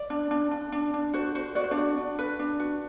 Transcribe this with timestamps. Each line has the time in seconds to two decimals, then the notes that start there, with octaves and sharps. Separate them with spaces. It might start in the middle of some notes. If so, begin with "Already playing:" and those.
Already playing: D5
0.10 D4
0.31 D4
0.51 D4
0.72 D4
0.94 D4
1.13 F#4 C5
1.35 F#4 C5
1.55 F#4 D5
1.64 C5
1.71 D4 D5
1.77 F#4
1.98 D4
2.19 B4
2.39 D4
2.60 F#4